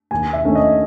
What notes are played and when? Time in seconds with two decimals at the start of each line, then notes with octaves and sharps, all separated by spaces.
0.11 D#2 G#5
0.33 E5
0.45 D#3 A3 C#4
0.55 D#5